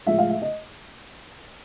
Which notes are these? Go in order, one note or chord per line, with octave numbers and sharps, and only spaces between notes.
A2 F3 G#3 E5
F5
E5
D#5